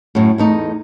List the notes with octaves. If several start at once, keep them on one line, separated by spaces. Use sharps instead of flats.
F#2 A2
E2 A3 D#4